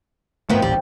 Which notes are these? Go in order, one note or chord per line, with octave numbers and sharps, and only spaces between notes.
G#2 D#3 F3 A3 B3
D#1 A1 G3